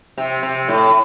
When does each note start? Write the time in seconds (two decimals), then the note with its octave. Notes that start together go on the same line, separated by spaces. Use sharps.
0.18 C3
0.43 C3
0.68 A2